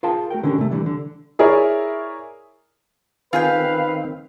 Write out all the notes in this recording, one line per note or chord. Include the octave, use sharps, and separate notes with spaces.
F4 G#4 A#4 F5 G5 A5
A3 F#4 A#4 G5
D3 D#3 C#4 G4 A#4
C3 A3
C2 G2 D3 E3 G3
D3
E4 G#4 A#4 C#5 D5 E5
D#3 C4 F4 G#4 B4 F5 G5